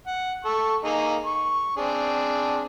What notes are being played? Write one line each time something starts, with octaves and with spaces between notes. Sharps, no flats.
F#5
A4 C#6
A#3 D#4 G#4
C#6
C4 D4 G#4